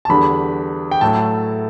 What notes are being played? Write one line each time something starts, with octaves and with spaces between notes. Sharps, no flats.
A5
E2 D3 G3 D4 B5
G5
A2 F#3 A3 A5